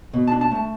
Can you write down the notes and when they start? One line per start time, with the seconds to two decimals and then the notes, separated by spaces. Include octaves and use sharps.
0.14 B2
0.27 D4 A5
0.41 A5
0.51 A3 A5